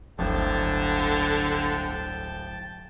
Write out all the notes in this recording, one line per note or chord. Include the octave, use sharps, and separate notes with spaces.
D1 G1 D3 G5 A5